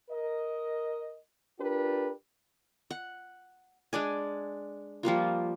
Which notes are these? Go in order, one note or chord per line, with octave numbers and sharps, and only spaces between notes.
A#4 D#5
D4 F4 G4 A#4 B4
F#5
G#3 D4 D5 G#5
F3 G3 A#3 F4